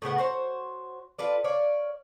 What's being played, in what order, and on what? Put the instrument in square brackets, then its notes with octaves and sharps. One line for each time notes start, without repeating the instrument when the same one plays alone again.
[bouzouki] A2 C#3 B3 F#5
F#4 C5 C#5
F4 A4 B4 D5
C#5 D5 F5